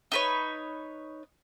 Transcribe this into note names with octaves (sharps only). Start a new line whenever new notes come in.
D#4 B4 C#5